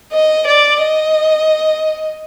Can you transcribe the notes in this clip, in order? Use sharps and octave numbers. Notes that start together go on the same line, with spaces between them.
D#5
D5
D#5